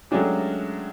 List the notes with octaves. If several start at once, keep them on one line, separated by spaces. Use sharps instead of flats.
F#3 G#3 A3 C#4 D4 G4